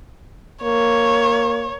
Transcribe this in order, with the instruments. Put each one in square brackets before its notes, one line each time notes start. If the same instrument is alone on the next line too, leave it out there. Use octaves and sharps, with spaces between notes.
[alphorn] A#3 [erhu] C#5